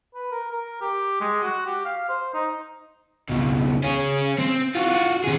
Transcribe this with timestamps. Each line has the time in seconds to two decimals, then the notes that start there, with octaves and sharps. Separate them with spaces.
0.14 B4
0.31 A#4
0.51 A#4
0.81 G4
1.21 G#3
1.43 F#4
1.66 G4
1.85 F5
2.09 C5
2.34 D#4
3.29 C#2 B2
3.84 C#4 G#4
4.39 C4
4.75 F4 F#4
5.24 C3 G#4